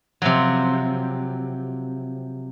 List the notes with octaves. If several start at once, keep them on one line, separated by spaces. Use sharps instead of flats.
C3 F3 F#3